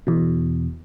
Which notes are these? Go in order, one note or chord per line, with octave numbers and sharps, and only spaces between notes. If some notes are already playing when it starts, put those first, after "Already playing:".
E2 B2